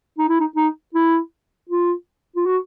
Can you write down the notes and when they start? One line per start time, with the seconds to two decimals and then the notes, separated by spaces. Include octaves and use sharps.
0.19 D#4
0.29 E4
0.40 D#4
0.56 D#4
0.95 E4
1.69 F4
2.36 F4
2.46 F#4